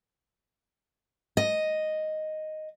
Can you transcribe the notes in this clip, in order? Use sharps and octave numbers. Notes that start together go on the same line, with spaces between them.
D#5